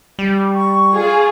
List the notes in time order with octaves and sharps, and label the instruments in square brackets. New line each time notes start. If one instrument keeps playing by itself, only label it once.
[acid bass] G3
[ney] C#6
[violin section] F4 G#4